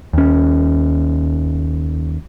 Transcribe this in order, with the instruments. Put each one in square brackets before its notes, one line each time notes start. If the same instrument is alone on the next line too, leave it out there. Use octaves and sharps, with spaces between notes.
[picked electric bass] D#2 C#4